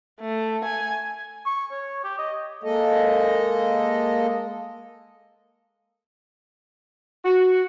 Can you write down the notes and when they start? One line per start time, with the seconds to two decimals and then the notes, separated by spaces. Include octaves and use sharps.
0.20 A3
0.64 G#5
1.46 C#6
1.72 C#5
2.04 G4
2.19 D#5
2.63 G#3 A#3 A4 D#5
7.24 F#4